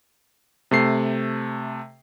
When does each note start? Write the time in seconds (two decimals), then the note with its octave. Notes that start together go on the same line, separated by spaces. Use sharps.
0.71 C3 A3 C7